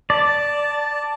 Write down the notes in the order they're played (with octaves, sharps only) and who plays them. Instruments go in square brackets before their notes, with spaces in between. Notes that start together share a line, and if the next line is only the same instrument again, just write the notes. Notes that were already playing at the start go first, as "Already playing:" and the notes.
[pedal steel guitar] D5 [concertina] A5